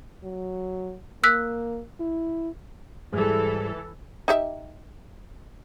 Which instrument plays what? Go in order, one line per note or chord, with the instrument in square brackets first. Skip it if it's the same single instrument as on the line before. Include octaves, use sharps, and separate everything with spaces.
[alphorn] F#3
[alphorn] A#3 [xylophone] E6 F#6 B6
[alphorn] E4
[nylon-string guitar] G#2 G3 [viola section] E3 A4
[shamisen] D#4 G4 E5